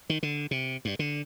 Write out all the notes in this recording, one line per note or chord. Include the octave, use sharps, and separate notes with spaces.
D#3
D3
C3
G2
D3